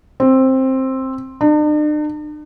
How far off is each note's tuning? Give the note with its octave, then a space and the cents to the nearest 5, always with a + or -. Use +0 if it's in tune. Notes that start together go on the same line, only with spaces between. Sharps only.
C4 +10
D4 +45